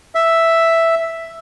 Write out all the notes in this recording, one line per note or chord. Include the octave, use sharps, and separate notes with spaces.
E5